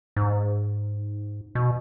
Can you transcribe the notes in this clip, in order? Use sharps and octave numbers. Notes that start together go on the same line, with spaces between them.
G#2
B2